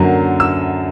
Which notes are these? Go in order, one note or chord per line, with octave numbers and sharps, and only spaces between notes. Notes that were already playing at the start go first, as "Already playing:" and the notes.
Already playing: F#2 D3 F#3 A#3
E6